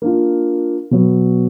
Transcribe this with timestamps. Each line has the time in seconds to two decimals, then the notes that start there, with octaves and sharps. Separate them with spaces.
0.02 A#3 D4 F4
0.91 B2 F#3 B3